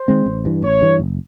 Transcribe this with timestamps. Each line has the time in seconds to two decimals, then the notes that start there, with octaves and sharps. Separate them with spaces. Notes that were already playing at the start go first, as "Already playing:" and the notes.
Already playing: C5
0.08 D#3 G#3 C4
0.26 A1
0.45 G2 E3
0.62 A1 C#5
0.81 G2 E3
1.00 F#1